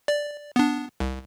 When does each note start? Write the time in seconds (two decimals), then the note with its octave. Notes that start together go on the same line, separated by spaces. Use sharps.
0.08 D5
0.56 B3 D4
1.00 C2